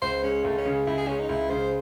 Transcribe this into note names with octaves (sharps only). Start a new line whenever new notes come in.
C#2 C5
G#3 C#4
C#2 A3
C#4
C#3
C#2 E4
G#4
G#3 C#4
D#4
C#2 E4
C#3 C5